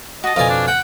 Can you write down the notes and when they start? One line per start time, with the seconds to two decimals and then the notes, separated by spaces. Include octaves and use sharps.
0.24 F#4 D#5 A5
0.36 F2 B2 F4 D5 F5 G#5
0.50 D4
0.68 F#5 G5